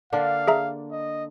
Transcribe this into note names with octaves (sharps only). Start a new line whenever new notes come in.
D3 A#3 D4 F5
G#4 E5 A#5
D#5